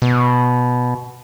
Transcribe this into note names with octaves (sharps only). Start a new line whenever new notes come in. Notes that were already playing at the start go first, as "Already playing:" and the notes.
B2